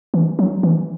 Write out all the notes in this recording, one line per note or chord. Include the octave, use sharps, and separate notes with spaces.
E3
F#3
E3